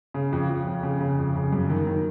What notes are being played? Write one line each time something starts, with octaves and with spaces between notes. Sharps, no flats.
C#3
F2
F2
F2
C#3
C#3
F2
C#3
F#2
D#3
D#3